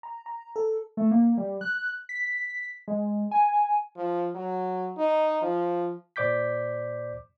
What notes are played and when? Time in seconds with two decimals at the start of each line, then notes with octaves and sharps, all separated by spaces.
0.03 A#5
0.26 A#5
0.56 A4
0.97 A3
1.11 A#3
1.38 G3
1.61 F#6
2.09 B6
2.88 G#3
3.31 G#5
3.96 F3
4.35 F#3
4.98 D#4
5.42 F3
6.16 A#2 C5 D5 D6 G6 B6